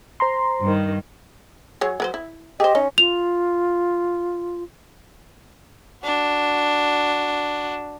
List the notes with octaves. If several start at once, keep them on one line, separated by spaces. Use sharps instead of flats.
C5 A#5 C6
G2 D#3
F#3 G#4 C#5
F#3 B4 C5
E4
G4 G#4 C5 D#5
C#4 D#4
F4 F7
D4 F#4